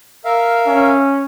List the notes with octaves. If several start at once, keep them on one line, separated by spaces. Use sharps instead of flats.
A#4 E5 F5
C#4